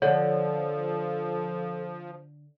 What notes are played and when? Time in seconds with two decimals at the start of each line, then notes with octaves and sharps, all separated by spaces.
0.02 D3 F3 A4 C#5